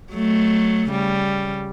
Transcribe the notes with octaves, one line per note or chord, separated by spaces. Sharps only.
F#3 A3
C#3 G3